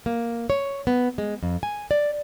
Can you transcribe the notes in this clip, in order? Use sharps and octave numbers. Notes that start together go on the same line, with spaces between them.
A#3
C#5
B3
G#3
F2
G#5
D5